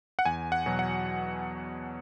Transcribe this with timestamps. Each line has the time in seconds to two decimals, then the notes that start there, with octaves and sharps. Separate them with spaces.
0.19 F#5
0.25 E2 G#5
0.52 F#5
0.66 B2 F#3
0.79 F#5